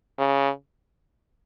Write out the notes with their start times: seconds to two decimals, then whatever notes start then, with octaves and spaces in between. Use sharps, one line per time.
0.18 C#3